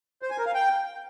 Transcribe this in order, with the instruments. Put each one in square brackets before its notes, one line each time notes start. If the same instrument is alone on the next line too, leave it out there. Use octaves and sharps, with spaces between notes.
[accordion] C5
G#5
A#4
F5
G5